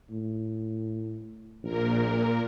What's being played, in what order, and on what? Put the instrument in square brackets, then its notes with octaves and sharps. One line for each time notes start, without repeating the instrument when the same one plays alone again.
[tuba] A2
[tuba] A#1 [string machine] A#2 A#4